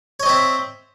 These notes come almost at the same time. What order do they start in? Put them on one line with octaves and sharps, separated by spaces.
C#5 D#5 C4 E5